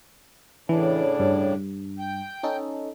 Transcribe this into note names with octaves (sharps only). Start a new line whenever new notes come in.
A2 C#3 E3 D4
G2
G5
C#4 D#4 A4